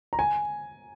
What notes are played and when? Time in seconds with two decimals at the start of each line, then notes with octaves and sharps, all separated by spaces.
0.13 A#5
0.19 G#5